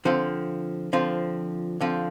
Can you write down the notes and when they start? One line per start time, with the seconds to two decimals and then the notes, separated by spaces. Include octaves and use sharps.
0.05 D3 F3 C4 F4
0.93 D3 F3 C4 F4
1.81 D3 F3 C4 F4